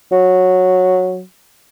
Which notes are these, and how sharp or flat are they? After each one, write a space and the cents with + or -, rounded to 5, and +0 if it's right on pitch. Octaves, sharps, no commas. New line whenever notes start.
F#3 -10